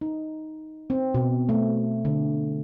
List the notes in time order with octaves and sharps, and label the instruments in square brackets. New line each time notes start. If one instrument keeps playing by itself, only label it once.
[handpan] D#4
C4
B2
A3
D3